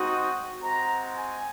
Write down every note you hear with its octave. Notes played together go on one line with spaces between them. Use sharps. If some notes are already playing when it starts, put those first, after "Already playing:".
Already playing: G#3 C4 D#4 F#4 D#6
G#3 C4 F#4 A#5
G#5